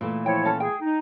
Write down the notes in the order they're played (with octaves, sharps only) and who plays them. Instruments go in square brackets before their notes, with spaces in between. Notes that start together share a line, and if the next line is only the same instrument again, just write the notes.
[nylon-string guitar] A#2 E3 A3
[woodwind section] F3 E4 C#5 [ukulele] G5
[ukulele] C#4 A4
[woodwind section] G#4 [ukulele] G5
[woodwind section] D#4